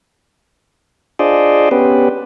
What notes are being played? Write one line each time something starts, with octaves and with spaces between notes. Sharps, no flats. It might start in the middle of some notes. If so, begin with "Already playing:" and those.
D4 F4 G#4 C5 D5 D#5
B3 C#4 G4 B4